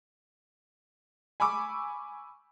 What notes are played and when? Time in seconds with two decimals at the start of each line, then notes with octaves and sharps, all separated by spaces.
1.40 G#5 B5 C#6 D6 E6